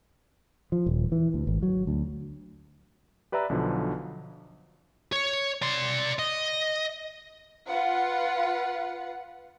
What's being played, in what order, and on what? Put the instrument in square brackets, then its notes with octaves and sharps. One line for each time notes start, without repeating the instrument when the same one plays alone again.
[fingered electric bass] F3
D#1
E3
D2
G#1
F#3
D2
[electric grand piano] G4 B4 D5 E5 A#5 E6
B1 D3 F3 F#3
[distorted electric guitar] C#5
D5 C6
D#5
[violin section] F4 B4 F#5